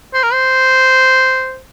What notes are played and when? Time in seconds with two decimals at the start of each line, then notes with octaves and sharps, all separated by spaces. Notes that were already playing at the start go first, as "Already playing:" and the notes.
0.14 C5
0.23 A#4
0.33 C5